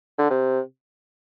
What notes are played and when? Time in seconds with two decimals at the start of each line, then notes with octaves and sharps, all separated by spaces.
0.18 D3
0.30 C3